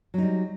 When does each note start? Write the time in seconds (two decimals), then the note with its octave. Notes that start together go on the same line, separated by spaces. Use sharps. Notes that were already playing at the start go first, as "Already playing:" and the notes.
0.14 F#3
0.18 D#4
0.23 G3